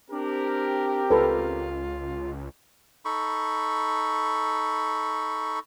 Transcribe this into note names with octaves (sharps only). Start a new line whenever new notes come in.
C4 D4 G4 A#4
C#2 F4 A4 B4
D#4 A4 B5 C#6